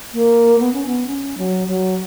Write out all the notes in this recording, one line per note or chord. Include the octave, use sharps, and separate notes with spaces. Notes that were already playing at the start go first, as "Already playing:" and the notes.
A#3
B3
C#4
B3
C#4
F#3
F#3